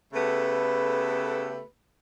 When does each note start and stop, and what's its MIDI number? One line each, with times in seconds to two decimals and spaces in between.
0.14 1.62 49
0.14 1.62 57
0.14 1.62 59
0.14 1.62 67
0.14 1.62 69
0.14 1.62 71